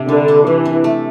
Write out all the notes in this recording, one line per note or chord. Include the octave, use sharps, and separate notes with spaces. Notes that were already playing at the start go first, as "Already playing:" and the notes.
Already playing: C3 D4
D3 G3
D4
C3 E3
C3
A3